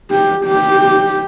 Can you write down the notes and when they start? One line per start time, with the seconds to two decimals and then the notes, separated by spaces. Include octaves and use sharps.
0.11 G4
0.45 G4